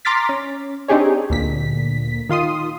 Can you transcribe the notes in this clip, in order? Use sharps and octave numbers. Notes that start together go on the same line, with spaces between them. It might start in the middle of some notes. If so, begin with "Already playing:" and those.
A#5 C6 D6 F6 A6 B6
C#4
C4 D4 D#4 G4 G#4 C#5
D2 A#2 B6
D#3 F4 C6 D#6